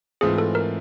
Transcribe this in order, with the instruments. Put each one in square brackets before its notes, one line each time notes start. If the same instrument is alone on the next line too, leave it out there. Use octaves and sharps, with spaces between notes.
[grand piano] G#2 E3 A3 C4 F4 [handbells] G#4
[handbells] A4
A#4